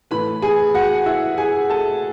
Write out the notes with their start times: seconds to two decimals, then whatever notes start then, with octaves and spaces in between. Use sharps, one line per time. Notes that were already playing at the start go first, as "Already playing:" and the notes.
0.11 A2 E3 B4 B5
0.42 G#4 G#5
0.74 F#4 F#5
1.06 E4 E5
1.38 G#4 G#5
1.70 A4 A5